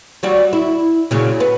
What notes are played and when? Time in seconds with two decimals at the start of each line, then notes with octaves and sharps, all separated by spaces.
0.23 F#3 G3 F#4
0.53 E4
1.11 A#2 C#3 F#3
1.40 B3